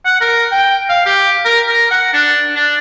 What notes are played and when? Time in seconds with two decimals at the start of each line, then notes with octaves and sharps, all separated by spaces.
0.05 F#5
0.21 A#4
0.52 G5
0.89 F5
1.06 G4
1.45 A#4
1.68 A#4
1.91 F#5
2.13 D4
2.56 D4